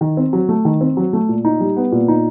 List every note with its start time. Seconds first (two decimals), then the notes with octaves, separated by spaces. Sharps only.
0.01 D#3
0.17 C4
0.33 F#3
0.49 A3
0.65 D#3
0.81 C4
0.97 F#3
1.13 A3
1.29 A#2
1.45 D#4
1.60 G3
1.76 B3
1.92 A#2
2.08 D#4